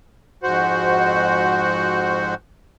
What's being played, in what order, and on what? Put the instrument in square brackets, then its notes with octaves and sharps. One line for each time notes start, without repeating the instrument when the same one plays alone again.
[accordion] F2 G#2 F#4 C5 F#5